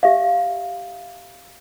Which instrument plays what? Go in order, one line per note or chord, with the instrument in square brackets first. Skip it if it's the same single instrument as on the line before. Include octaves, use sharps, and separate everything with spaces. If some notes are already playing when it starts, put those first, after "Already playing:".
[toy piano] G4 E5 F5